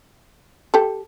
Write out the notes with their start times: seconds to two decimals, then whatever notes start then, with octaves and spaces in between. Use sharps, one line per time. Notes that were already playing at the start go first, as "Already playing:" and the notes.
0.74 G4 A4